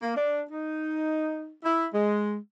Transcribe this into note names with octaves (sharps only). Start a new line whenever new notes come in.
A#3
D4
D#4
E4
G#3